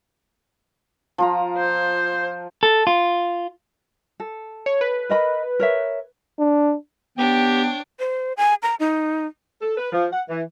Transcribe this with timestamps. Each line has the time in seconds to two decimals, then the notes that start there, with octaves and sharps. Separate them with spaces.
1.18 F3 F4 A#5
1.57 C5
2.63 A4
2.87 F4
4.20 A4
4.66 C#5
4.81 B4
5.10 A#4 D#5 B5
5.60 A#4 C#5 E5
6.39 D4
7.18 B3 D4 G4 C#5 G5
8.00 C5
8.37 G#5
8.63 A#5
8.80 D#4
9.61 A4
9.78 B4
9.92 F3
10.12 F#5
10.28 E3